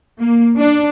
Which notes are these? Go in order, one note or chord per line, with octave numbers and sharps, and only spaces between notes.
A#3
D4